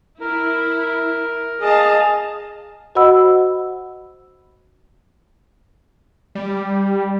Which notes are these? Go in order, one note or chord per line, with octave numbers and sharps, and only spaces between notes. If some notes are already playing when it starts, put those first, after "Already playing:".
E4 A#4
G#4 D#5 F5 A5
F#4 C5 D#5 F#5 B5 E6
G3